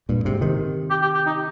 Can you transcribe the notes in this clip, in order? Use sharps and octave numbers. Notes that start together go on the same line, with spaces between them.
G2 A#2
G#2 C3
C3 D#3
G4
G4
G4
D#4